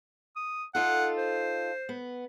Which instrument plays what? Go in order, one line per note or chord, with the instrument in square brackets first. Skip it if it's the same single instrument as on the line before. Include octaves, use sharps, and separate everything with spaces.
[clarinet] D#6
[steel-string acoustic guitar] D#4 F4 A4 [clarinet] F#5
[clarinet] C5
[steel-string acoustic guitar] B3